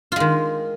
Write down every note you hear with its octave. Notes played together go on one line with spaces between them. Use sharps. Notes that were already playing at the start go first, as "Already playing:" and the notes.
D#3 G#3 F4